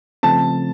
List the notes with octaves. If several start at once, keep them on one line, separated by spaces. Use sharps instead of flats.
C#3 F3 A3 C4 A5